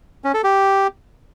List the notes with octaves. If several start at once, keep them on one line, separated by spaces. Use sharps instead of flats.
C#4
A4
G4